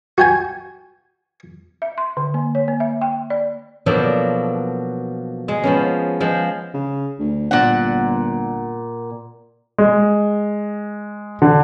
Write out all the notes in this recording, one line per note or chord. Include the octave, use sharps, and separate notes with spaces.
F#4 G5 G#5
E5
C6
D3
A#3
C#5
A#3
E5
G5
D5
B2 F3 F#3 A#3 D4 A4
G#3
F3 B3 C#4
F3 G#3
C#3
D2
G1 A#2 F#5
G#3
D3